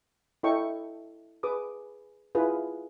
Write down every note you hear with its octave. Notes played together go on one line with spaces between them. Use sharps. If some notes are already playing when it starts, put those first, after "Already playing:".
E4 A4 C#5 D#5 G5 C#6
G#4 B4 D6 D#6
E4 F4 G#4 B4